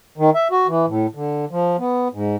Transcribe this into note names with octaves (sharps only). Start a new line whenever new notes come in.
D#3
E5
F#4
E3
A2
D3
F3
B3
G#2